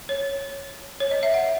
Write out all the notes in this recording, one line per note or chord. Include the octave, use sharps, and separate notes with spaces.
C#5
C#5
D#5
E5
F#5